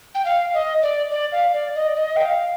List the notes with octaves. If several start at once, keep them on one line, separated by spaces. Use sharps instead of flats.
G5
F5
D#5
D5
D5
F5
D5
D#5
D5
D#5
G5
F5